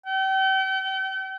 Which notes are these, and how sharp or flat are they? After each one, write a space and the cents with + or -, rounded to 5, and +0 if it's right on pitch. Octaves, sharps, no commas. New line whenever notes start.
G5 -40